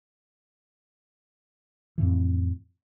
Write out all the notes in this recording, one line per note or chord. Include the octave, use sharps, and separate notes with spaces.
F2 A2 E3